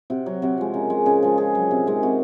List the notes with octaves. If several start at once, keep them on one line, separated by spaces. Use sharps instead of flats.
C3 F#4
F#3
C3 F#4
F3 G#3
C#3 A#4
G#3
C#3 G#4
F3 G#3
C#3 G#4
F#3
C3
D#3 G#3
C3 F#4